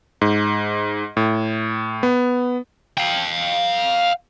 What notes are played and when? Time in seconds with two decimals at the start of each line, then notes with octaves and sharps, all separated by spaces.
0.21 G#2
1.17 A2
2.03 B3
2.98 F5 G5